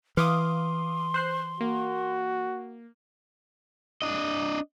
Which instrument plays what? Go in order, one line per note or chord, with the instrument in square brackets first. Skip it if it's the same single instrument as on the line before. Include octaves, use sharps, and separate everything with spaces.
[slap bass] E3 [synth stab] F5 D6 D#6 [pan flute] C6
[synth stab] C5 F#6 C7
[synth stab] A#3 [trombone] F#4
[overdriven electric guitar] D4 D#5